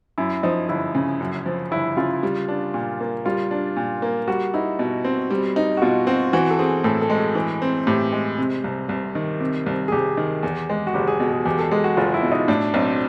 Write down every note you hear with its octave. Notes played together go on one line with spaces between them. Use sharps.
F#2 E4
F3 D#4
G1 E4
C#3
F#2
F3
G1 E4
C#3 F4
G3
D4
A#2
A#3
G3 F4
D4
A#2
A#3
G3 F#4
D#4 E4
B2
C4
G3
D#4
F#4
B2 F4
C4 F#4
E3 F#4
A4
C4 G#4
A2 A4
A4
G#3
G#4
E3
C4
A2 G4
G#3
C3
C2
C2
D#3
C3
C2
G#4
C2 G4
D#3
E2
G#3
F#4
F#1 G4
G#4
B2
G#4
E2 G4
A4
G#3 G#4
F#4
F#1 F4
E4
B2
D#4
A2 D4
B1 C4